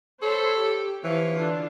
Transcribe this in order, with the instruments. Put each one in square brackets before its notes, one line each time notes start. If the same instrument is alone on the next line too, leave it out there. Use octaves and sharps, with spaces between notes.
[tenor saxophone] A4 [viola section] C5 C#5 B5
[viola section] G4
[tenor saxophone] E3 [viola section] F3 C#5 F5
[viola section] D3 D4 F4